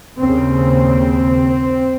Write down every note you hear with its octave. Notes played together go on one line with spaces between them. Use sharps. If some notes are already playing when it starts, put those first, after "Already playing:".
D#2 C#3 C4